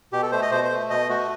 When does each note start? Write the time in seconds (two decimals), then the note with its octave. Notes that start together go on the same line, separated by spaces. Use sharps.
0.13 B2 G4
0.22 A4
0.32 A3 C5
0.42 D#5
0.52 B2 C5
0.64 C5
0.71 A3
0.90 B2 D#5
1.09 A3 F#4